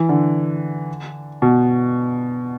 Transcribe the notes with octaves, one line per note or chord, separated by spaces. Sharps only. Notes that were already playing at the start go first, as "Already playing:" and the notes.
Already playing: E3
D3
B2